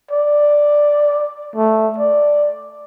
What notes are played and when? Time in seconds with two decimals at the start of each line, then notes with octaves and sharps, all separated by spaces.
0.11 D5
1.56 A3
1.98 D5